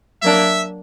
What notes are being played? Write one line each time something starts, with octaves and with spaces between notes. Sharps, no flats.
F#3 A#3 D4 E5